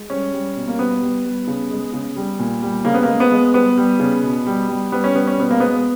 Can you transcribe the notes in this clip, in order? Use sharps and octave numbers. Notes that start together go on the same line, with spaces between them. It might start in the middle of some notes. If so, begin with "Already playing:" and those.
Already playing: G#3
G3 C#4
G3
B2
A#3
G3 B3
G3
G3
C#3
G#3
C#3
G3
A#2
G3
C#3 A#3
B3
G#3 A#3
B3
G#3
G3 B3
G3
C#3
B2
G3
G3
G3 B3
C#4
G3 B3
C#4
B2 B3
A#3
G#3 B3